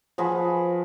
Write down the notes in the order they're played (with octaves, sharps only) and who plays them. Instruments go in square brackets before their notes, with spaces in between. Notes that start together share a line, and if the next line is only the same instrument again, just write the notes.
[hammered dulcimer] F3 F#4 G#4 B4